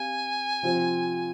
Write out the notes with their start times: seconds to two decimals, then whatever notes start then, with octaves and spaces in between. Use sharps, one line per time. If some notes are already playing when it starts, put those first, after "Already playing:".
Already playing: C4 G4 F5 G#5
0.63 C3 F3 C4 F4 C5